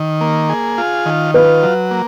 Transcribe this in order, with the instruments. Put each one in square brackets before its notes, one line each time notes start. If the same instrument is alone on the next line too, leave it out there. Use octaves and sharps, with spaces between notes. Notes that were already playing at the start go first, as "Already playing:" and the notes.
Already playing: [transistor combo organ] D#3
A#3
G#4
F4
D#3
[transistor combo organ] F4 [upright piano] B4
[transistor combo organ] F#3
A#3